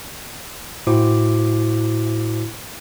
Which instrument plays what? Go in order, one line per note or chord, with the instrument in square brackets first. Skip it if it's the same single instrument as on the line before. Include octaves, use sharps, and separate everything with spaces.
[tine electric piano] A2 E4 F#4 C5 D6